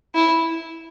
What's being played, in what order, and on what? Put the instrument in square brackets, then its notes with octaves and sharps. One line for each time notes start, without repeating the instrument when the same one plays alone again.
[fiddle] E4